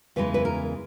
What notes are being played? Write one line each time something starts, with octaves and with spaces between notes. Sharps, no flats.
E2 C#3 E3 G#3 B4
B4
A#4